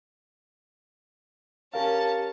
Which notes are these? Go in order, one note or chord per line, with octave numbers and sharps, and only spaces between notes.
C#4 G4 A#4 F5 A5